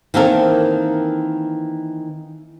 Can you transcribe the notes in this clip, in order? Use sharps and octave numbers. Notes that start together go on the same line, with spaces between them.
D#3 E3 A#3 C4 A4 A#4